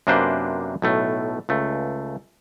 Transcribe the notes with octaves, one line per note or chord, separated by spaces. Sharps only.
F#2 C3 A#3 D4 B4 C5
B1 A2 A3
C#2 A3